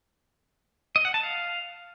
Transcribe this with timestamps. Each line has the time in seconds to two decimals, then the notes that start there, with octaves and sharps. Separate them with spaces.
0.96 D#5
1.05 F#5
1.14 A5
1.23 F5